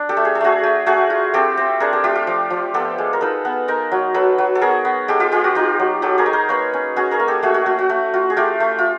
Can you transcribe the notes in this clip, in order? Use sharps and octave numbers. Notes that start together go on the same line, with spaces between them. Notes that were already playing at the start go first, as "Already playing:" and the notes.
Already playing: D4
G4 A4
A3
G#4
A4
A3 F#4 G#4
A3
A3 F#4 G#4
F4
C4 G4 A4
C4
D4 G#4 A#4
G4 A4
A3 F4 G4
F4
F3
F3
B3 G4 A4
G#3
A#4
D#4 A4 B4
B3
D#4 A#4 C5
F#3
F#3 A4 B4
F#3
A4
B3 G#4 A#4
B3
G#3 G4 A4
F4 G4
G#3 F4 G4
F#4
D#4 F4 G4
F#3
F#3 G4 A4
G#4 A#4
D#4
A#4 C5
A#3 B4 C#5
C#4
C#4 F#4 G#4
G#4 A#4
A#3
G4 A4
A3 F#4 G#4
F#4
A3 F#4
F#4
A3
F4 F#4
G#4
A3 F4 G4
A3
F4